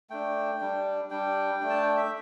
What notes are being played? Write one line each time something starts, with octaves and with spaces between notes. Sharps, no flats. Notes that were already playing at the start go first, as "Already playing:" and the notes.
A3 D4 G5
G3 D4
G3 D4 G5
A3 D4
A5
G5
E5